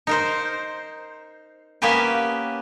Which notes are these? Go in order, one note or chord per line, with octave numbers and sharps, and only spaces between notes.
D#4 A#4 C5
A#3 B3 C#4 G4 B4